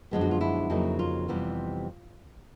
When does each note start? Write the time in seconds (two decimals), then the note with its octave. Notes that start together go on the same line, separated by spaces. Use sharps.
0.11 F#2 D3 F3 G#3 B3
0.21 F#4
0.31 F4
0.41 E4
0.70 F2 C#3 F#3 A#3 D#4
0.99 F4
1.28 F2 C3 E3 G3 B3